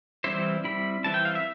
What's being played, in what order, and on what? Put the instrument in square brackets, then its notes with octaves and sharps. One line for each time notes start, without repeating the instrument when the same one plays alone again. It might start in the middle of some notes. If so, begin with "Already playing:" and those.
[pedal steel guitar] E3 G3 C4 E4 C5
G3 C4 E4 B5
E3 G3 C4 E4 A5
G5
F5
E5